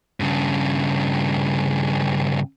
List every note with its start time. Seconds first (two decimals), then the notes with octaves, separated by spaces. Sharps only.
0.20 G2 C#3